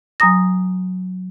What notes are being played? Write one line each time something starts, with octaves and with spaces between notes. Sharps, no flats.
F#3 G#5 A#5 D#6 A#6